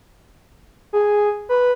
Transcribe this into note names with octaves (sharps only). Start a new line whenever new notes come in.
G#4
B4